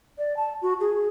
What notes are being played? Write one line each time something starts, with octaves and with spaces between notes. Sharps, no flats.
D5
A5
F#4
G#4